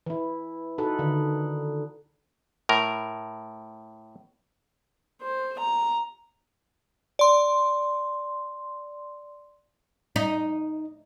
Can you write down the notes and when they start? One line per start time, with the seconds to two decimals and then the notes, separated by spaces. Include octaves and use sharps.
0.06 E3 E4
0.78 D#4 F#4 A4 B4
0.99 D3 D#3
2.69 A2 A#4
5.22 C5
5.59 A#5
7.19 D5 C6
10.16 D#4